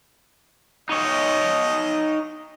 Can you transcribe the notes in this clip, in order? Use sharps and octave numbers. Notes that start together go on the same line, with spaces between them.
D#4 C#5 D#5